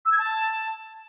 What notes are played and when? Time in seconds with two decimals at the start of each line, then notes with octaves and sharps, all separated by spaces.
0.05 E6
0.12 G#6
0.18 A5